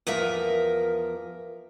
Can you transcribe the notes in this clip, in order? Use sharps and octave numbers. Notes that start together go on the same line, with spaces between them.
E2 F3 A#4 E5